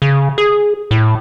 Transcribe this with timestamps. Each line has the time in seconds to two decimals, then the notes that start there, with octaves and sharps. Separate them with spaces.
0.02 C#3
0.38 G#4
0.91 A2